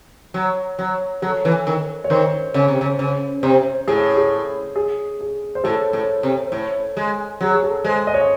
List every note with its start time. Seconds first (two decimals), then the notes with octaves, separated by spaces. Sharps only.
0.34 F#3
0.79 F#3
1.22 F#3 A4
1.45 E3
1.67 D#3
2.04 C#5
2.10 D#3 C5
2.54 C#3 C#5
2.68 C3
2.81 C#3
2.99 C#3 C5
3.43 C3 C5
3.87 A2 G#4
4.17 G#4
4.76 G#4
5.21 G#4
5.55 C5
5.64 A2 A4
5.93 A2
6.23 C3
6.52 A2
6.97 G#3
7.41 F#3 G#4
7.54 G#4
7.63 A4
7.84 G#3 C5
8.07 D#5
8.14 C#5
8.21 D#5